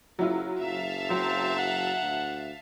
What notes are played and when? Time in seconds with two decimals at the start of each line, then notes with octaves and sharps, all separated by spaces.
0.19 F#1 F#3 E4 F4
0.59 F#1 E5 F5 A5
1.10 F#3 C4
1.59 F#5
2.01 D2